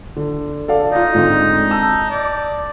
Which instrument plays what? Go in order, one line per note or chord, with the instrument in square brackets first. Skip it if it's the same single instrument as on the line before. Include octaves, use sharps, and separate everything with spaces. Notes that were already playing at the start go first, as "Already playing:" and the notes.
[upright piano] D3
A4 D5 F5
[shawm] D#4 [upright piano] F4 D5
[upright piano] G#2 D3 C4
A5 E6
[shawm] D5